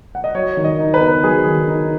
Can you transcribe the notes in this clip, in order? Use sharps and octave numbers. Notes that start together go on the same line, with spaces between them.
F#5
D#5
F#3 C#5
D#3
D#5
D#4
B4
B3
F#3 G#4
D#3
D#4